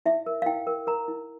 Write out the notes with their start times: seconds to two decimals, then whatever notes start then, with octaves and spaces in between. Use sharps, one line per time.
0.06 E4 E5
0.26 A#4
0.42 F5
0.46 E4 G5
0.67 A#4
0.87 A#4 A#5
1.08 E4